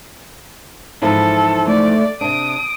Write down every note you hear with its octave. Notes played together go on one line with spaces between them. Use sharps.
G#2 E3 F3 A4
A3 D5
C3 D4 D#6 D7